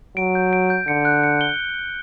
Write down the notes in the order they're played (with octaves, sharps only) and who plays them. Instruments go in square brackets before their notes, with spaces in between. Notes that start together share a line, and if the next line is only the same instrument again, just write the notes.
[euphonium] F#3 [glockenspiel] D7
[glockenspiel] G6
D7
G6
[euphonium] D3 [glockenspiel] C#7
[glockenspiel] F#6
C#7
G7